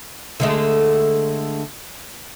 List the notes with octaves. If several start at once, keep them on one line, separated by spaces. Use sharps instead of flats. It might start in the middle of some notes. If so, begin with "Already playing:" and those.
D3 G#3 A3